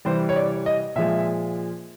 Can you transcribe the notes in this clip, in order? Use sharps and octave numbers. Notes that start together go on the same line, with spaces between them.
C3 E3 G3 C5
C#5
D5
D#5
A#2 F3 G#3 E5